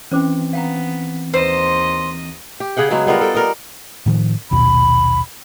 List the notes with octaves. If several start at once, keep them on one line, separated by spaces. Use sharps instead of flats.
E3 C4 C#4 C5 D6
B3 F5 G5 A#5
D#2 B4 C5 D#5
G4
C#3 G#4 F#5 G5
C#3 F#3 G#3 B3
G3 B3 F4 A#4
A4 G5
G3 A#4 D#5
A2 D#3 F3
A#1 D#2 B2 B5